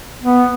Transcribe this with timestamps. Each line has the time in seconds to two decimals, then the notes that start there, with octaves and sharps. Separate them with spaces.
0.22 B3